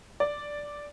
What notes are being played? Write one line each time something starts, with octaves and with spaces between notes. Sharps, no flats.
D5